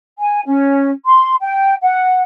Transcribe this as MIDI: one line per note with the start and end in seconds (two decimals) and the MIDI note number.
0.19 0.41 80
0.45 0.91 61
1.06 1.33 84
1.41 1.74 79
1.82 2.21 78